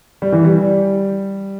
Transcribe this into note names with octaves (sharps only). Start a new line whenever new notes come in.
G3
E3
G3